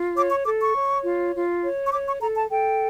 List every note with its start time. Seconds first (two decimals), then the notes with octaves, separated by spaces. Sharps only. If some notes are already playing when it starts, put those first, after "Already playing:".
Already playing: F4
0.15 C#5 D6
0.31 C#6
0.45 A4 D6
0.59 C#6
0.75 C#5
1.04 F4
1.34 F4
1.63 C#5
1.86 C#6
1.92 C#5 D6
2.07 C#6
2.21 A4 A#5
2.36 A5
2.51 A4 G5